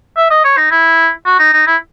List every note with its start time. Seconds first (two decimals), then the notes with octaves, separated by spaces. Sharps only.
0.17 E5
0.30 D#5
0.44 C#5
0.57 D#4
0.71 E4
1.26 F#4
1.39 D#4
1.53 D#4
1.67 E4